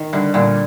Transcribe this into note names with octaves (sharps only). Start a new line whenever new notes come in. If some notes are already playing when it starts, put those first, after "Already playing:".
Already playing: D#3
G2 D3
G2 A#2 D3